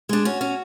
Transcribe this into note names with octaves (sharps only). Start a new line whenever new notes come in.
G#3 D4
C#4 F#4
C#4